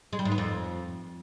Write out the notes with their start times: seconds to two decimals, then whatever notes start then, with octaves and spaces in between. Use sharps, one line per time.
0.13 G#3
0.19 G3
0.25 G#2
0.32 B3
0.38 F2